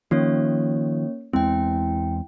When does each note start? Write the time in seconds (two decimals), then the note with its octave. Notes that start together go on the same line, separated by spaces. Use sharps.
0.11 D#3 F3 A#3 C#4 C#5
1.33 E2 G#3 C4 E4 G5